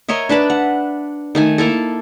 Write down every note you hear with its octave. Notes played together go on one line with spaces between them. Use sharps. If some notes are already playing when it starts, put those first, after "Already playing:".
A#4 C#5 D#5 E5
D4 B4 A5 B5
F#5
D#3 A3 G#5
A#3 E4 A4